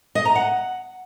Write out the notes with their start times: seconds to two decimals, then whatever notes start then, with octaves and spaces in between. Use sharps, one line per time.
0.15 D#5
0.25 A#5
0.36 F#5